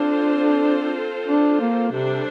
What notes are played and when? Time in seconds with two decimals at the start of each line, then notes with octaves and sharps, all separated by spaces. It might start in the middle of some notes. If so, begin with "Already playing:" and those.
Already playing: C4 D4 F4 A4 C5
1.27 D4
1.61 A#3
1.92 C3 G3 D4 A4 C5